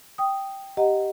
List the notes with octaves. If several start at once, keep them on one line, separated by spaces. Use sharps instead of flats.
G5 D#6
G4 D#5 F#5 A#5